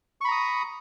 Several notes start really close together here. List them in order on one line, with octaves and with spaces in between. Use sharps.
C#6 B5 A#5 D#6